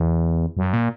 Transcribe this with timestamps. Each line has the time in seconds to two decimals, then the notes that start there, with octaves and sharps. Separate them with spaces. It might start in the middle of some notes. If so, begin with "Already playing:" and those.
Already playing: E2
0.57 F#2
0.73 A#2